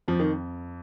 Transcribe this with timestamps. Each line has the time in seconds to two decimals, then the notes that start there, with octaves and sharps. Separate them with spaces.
0.08 F2 F3
0.20 D#3